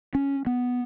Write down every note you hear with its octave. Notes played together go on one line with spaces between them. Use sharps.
C#4
B3